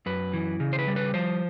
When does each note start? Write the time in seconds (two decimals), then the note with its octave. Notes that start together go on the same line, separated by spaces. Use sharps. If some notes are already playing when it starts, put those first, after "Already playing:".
0.06 F#2 B4
0.33 E3
0.60 C#3
0.73 C5
0.79 B4
0.87 G3
0.96 B4
1.14 F3 C5